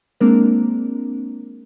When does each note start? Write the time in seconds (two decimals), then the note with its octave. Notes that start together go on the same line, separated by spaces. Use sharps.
0.21 G#3 A#3 C4 D4 A#4